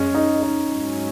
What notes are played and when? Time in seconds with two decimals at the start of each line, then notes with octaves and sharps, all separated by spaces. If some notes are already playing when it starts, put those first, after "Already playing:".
Already playing: F#2 C#3 G#3 C#4
0.14 D#4
0.43 D#4
0.71 G#2 F#3 C#4